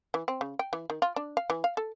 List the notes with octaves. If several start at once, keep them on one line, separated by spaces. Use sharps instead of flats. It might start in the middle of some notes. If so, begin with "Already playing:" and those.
E3
C4
C#3
G5
E3
D#3
F4
D4
F5
E3
F5
A4